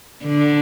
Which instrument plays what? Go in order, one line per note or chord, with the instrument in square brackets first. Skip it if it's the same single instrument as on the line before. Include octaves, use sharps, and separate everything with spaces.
[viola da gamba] D3